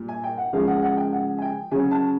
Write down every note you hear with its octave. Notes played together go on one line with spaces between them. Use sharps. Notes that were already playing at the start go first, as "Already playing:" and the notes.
Already playing: A#2 G3
G#5
G5
F#5
C#3 F3 G#3 F5
F#5
F#5
G5
F#5
G#5
G5
C#3 F#3 G#5
A5